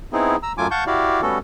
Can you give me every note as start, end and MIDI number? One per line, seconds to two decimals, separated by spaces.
0.13 0.36 59
0.13 0.36 60
0.13 0.36 63
0.13 0.36 64
0.13 0.36 68
0.43 0.52 82
0.43 0.52 88
0.58 0.67 42
0.58 0.67 54
0.58 0.67 57
0.58 0.67 65
0.58 0.67 80
0.58 0.67 86
0.71 0.84 77
0.71 0.84 78
0.71 0.84 81
0.71 0.84 85
0.71 0.84 91
0.87 1.21 64
0.87 1.21 66
0.87 1.21 67
0.87 1.21 74
0.87 1.21 77
1.22 1.38 55
1.22 1.38 57
1.22 1.38 59
1.22 1.38 61
1.22 1.38 66
1.22 1.38 69